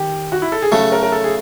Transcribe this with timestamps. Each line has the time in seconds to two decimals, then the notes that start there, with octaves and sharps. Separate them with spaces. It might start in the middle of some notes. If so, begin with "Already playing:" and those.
Already playing: D#3 G4
0.32 F#4
0.42 E4
0.52 A4
0.62 G#4
0.72 C#3 F#3 A3 A4
0.92 A#4
1.03 A#4
1.12 A4
1.24 G#4